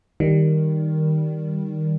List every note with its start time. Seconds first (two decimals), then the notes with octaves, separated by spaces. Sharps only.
0.20 D#3 G3